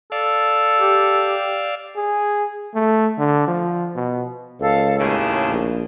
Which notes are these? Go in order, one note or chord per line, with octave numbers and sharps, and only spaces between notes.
A4 D5 F5 E6
G4
G#4
A3
D3
F3
B2
C#2 A4 F5
D#2 A2 C#3 A5
A#1